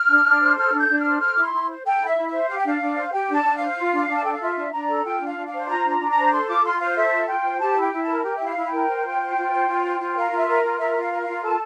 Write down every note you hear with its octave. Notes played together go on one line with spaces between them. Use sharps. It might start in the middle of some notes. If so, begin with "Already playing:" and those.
Already playing: F6
D4
D4
C5
A4 F6
D4
G6
D4
C5 F6
A4 F6
E4 D6
C6
E4
C5
A4 G5
E4 E5
E4
E5
C5
G4 F5
G5
D4 F5
D4
C5
G4 G5
D4 A5
D4
C5 F5
F4
D4
D4
A5
A4 G5
F5
F4 E5
D4
D4 A#5
A4
F4 G5
D4
F5
D4
F5
C5
F4 A#5
D4
A#5
D4
A#5
C5
A4 C6
F4 D6
F4 C6
C5 F5
A4 E5
F4
F4 G5
C5
G4 A5
E4
G5
E4
A5
A#4
G4 G5
E4 E5
F5
E4
G5
A#4
C5
F4
C5
F4
C5
F4
C5
F4
A#4 F5
F4
E5
A#4
F4
A#4 E5
F4
F5
A#4
F4 F5
A4 A5